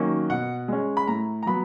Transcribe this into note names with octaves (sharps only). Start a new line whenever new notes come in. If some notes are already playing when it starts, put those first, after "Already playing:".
Already playing: D#3 F#3 A#3 C#4
B2 F#5
G#3 C#4
B5
A2 A#5
A#5
F#3 B3 B5